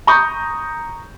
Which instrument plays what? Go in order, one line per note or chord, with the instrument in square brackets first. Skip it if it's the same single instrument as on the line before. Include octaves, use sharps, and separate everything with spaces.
[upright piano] A#5 C#6 D#6 G6